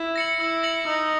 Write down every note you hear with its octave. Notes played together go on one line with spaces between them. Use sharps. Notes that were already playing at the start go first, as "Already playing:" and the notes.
Already playing: E4
A#6 C#7 F#7
E4 E6
A#6 C#7 F#7
D#4 E6